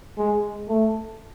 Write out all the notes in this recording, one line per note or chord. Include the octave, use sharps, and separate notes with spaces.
G#3
A3